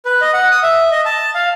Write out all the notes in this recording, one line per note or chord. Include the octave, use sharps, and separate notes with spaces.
B4
D#5
F#5
D#6
E5
D#5
A5
F5